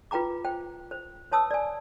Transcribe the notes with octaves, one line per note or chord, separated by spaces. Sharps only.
F4 B4 G5 A#5 D6
C5 G5
C5
B4 C#5 A5 D#6 E6
D5 G#5